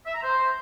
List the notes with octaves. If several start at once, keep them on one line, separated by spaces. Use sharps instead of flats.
E5
A#5
C5